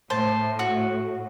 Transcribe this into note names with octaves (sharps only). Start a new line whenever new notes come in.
A2 C5 A5
F#4